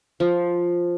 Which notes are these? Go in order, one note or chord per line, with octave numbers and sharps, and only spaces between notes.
F3